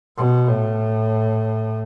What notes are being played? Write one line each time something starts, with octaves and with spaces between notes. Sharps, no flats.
B2
A2